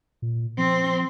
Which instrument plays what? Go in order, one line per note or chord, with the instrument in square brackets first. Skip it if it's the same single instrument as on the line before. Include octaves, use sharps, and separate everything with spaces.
[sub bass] A#2
[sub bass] F3 [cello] C4